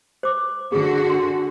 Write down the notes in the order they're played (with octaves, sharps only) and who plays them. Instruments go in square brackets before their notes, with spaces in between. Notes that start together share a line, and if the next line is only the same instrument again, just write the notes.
[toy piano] C5 D6
[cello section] D3 F#4 [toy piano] G#4
[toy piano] D4 C6